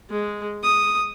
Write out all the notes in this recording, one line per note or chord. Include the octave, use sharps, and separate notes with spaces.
G#3
D#6